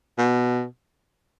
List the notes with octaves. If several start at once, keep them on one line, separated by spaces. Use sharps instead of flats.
B2